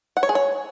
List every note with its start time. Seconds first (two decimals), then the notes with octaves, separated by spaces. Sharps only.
0.17 F#5
0.23 C#5
0.29 G#4
0.35 C#5